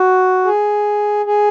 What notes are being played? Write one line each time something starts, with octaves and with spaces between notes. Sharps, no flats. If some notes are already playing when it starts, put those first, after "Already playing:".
Already playing: F#4
G#4
G#4